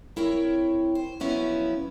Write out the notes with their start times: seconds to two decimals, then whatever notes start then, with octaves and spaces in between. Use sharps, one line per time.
0.16 C4 E4 A#4 C#5 G5
0.95 C5
1.20 F3 F#3 B3 C#4 E4